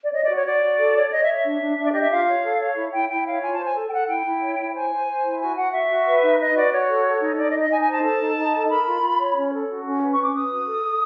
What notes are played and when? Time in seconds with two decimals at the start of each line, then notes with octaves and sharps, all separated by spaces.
0.02 D5
0.11 C#5 D#5
0.23 D5
0.28 F#4
0.35 C#5
0.44 F#4 D5
0.62 F#4
0.78 A4
0.95 C#5
1.10 C#5 D#5
1.22 E5
1.27 C#5
1.33 E5
1.43 D4
1.61 D4
1.77 D4
1.83 D5
1.92 G4 D#5
2.01 E5
2.10 F4 F5
2.27 C#5
2.43 A4
2.59 C#5
2.76 E4
2.92 E4 G5
3.09 E4 G5
3.26 C#5 F5
3.41 F4 G#5
3.53 A5
3.58 C5
3.64 G#5
3.74 A4
3.87 G5
3.91 A4 F#5
4.07 E4 G5
4.24 E4
4.40 C#5
4.58 E4
4.74 C5 G#5
4.90 C5
5.06 C5
5.22 E4
5.40 F#4 G#5
5.55 F#4 F#5
5.72 F#4 E5
5.89 F#4
6.06 B4
6.22 D#4
6.38 B4 D#5
6.55 F#4 D5
6.72 F#4 C#5
6.87 A4
7.05 A4
7.21 D#4
7.37 D#4 D5
7.48 D#5
7.53 D#4
7.60 D#5
7.70 D#4 G#5
7.81 G#5
7.86 C5
7.92 A5
8.03 A4 A5
8.19 D#4
8.37 D#4
8.53 A4
8.68 A#4 B5
8.86 F4
9.02 F4
9.18 C#5
9.35 C#4
9.51 A4
9.67 F#4
9.84 C#4
10.00 B4
10.12 C#6
10.17 C#4
10.23 D6
10.34 B4 D#6
10.50 F#4
10.67 A4
10.84 A4